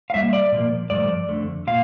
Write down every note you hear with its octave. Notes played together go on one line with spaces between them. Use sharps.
F5
A2 G3 A#3 E5
D5
A#2 F3 A#3
G2 F3 A3 D5
F2 D3 A3
A#2 F5